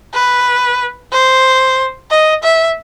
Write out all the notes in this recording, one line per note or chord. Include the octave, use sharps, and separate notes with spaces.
B4
C5
D#5
E5